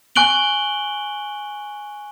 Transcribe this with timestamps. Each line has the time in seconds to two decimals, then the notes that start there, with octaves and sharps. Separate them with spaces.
0.16 G#5 C#6 F#6 D7 F#7 G7